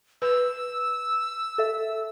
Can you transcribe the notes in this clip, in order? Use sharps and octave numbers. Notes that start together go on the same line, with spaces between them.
B4 E6
A4 E5